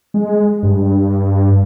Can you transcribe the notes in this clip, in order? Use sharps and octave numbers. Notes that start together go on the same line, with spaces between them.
G#3
G2